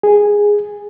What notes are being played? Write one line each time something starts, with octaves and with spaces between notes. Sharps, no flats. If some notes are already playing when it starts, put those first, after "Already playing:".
G#4